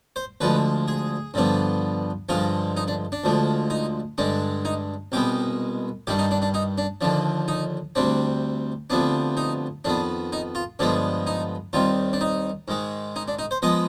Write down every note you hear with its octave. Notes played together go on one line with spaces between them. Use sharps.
C5
D2 D3 F3 G#3 B4
G#4
G2 D3 F3 B3 D4
G2 D3 F3 G#3 F4
D#4
D4
D4
D2 D3 F3 G#3
D#4
G2 D3 G#3 D4
D#4
C2 B2 G#3 B3 G4
G2 D#3 G3 D4 G4
D#4
D4
D4
D#4
D4
D#2 D3 F3 D4
D#4
D2 C3 G3 C4 D4
D2 C3 F3 B3 D4
D#4
F2 D#3 B3 D4
D#4
F4
G2 D3 F3 G#3 B3 D4
D#4
D#2 D#3 G3 C4 F4
D4
D#4
G#2 D#3 G#3
D#4
D4
D#4
C5
F3 G#3 B3 D#5